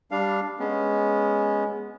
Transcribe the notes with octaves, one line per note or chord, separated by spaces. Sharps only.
G3 D4 F5
G#3 B3 C#4